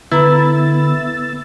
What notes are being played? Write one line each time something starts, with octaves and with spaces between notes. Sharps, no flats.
D3 B3 E4 B4 A#5 B5 E6 A6